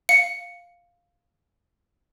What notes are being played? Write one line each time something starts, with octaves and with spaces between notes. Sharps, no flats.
F5 C#7